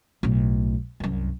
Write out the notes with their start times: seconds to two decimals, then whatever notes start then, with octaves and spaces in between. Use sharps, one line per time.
0.23 B1 A2
1.00 C2 F#2